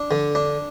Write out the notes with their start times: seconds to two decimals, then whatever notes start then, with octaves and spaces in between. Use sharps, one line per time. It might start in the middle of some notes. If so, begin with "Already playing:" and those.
Already playing: D4
0.11 D3
0.35 D4